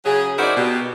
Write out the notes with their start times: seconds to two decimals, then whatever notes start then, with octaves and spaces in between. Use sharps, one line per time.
0.05 C#3 F#3 C#4 G#4
0.39 D#4 E4 F#4 A#4 C5 D5
0.57 B2 G4